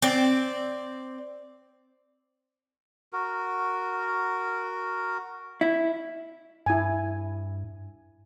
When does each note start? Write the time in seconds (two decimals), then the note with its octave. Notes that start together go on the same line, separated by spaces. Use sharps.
0.02 C4 D5
3.13 F#4 A#4
5.61 E4
6.66 G2 E4 G#5